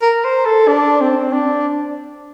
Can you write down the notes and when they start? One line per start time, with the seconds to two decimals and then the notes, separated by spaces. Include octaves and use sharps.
0.02 A#4
0.24 C5
0.46 A4
0.68 D4
1.01 C4
1.33 D4